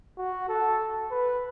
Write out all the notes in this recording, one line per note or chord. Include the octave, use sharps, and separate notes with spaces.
F#4
A4
B4